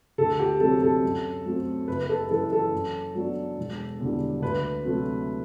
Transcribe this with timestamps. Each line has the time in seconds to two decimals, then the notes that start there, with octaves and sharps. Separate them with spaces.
0.18 D2 A4
0.40 G4
0.60 C3 F#3 C4 A4
0.82 A4
1.03 F#2
1.46 F#3 A3 C4
1.88 F#1 B4
2.01 B4
2.09 A4
2.25 B4
2.30 F#2 E3 A4
2.52 A4
2.73 F#2
3.15 F#3 B3 D4
3.58 E1
4.00 E2 D3 G3
4.42 D2 B4
4.85 C3 F#3 A3